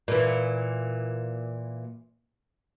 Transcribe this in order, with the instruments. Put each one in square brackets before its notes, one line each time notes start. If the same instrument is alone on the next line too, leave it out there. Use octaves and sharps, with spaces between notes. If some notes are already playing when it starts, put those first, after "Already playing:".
[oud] A#2 E3